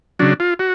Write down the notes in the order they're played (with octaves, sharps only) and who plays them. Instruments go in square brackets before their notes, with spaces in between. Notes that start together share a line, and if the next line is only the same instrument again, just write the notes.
[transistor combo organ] C#3 F#3 D4
F4
F#4